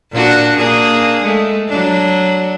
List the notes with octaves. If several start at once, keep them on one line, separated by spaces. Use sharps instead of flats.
A#2 D4 F#4
A#3 D4 G#4
G#3 A3
F#3 D4